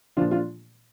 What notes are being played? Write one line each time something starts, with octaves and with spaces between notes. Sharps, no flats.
A#2 F3 D4 F4
D4 F4